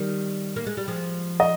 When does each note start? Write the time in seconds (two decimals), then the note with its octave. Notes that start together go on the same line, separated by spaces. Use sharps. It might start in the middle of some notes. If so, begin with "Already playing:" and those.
Already playing: D#3 G3
0.56 A#3
0.66 G#3
0.77 G3
0.87 F3 G#3
1.40 D#5